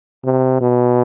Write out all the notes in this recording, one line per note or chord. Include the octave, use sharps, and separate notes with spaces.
C3
B2